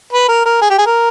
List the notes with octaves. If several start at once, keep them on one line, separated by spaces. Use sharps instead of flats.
B4
A#4
A#4
G#4
G4
G#4
A#4